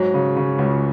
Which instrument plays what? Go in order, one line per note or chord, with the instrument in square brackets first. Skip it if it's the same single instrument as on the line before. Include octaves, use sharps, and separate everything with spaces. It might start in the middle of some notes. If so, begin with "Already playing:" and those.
Already playing: [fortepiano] G#2 F#3
C#3
C#3
C#2